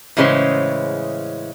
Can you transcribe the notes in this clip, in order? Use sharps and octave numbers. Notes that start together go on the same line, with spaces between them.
A2 C#3 E3 G#3 C#4 C5